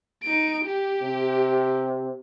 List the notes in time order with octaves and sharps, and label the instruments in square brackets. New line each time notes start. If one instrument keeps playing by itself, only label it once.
[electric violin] D#4 D7
G4
[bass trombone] C3